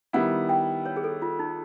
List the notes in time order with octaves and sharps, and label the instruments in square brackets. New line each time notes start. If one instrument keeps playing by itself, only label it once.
[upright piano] D#3 G3 B3 E4 [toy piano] F#5
[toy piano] G5
C#5
G#4
A4
F4
D#4